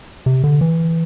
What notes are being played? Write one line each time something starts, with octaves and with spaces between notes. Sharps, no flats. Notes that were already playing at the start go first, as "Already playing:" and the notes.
C3
D3
E3